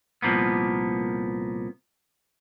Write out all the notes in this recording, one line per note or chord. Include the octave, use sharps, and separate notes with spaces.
C2 A#2 F3 A#3 B3